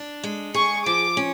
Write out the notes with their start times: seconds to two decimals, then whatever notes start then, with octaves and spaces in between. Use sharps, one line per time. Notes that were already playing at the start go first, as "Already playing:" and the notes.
Already playing: D4
0.24 G#3
0.54 G#4 C#6
0.86 F3 D6
1.17 C#4